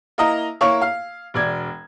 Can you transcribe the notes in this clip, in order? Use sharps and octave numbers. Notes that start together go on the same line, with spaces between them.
A#3 E4 D#5 A#5
A#3 E4 C#5 C#6
F5
E1 D5 G#6